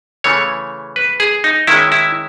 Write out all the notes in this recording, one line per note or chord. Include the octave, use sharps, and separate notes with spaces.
C#3 E3 A3 C#5
B4
G#4
D#4
D#3 G#3 C#4 E4
E4